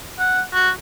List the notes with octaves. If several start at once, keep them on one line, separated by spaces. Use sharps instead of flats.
F#5
F#4